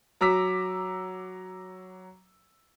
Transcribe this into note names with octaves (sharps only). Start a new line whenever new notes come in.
F#3 A#5 D6 E6 B6